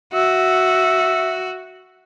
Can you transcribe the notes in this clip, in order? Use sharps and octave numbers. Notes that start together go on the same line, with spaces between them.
F#4 E5